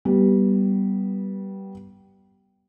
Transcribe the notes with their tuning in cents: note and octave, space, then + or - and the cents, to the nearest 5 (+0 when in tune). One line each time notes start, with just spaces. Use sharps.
G3 -15 B3 -15